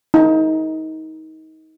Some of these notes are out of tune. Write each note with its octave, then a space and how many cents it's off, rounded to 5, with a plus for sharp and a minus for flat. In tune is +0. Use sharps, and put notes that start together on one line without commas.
D#4 +25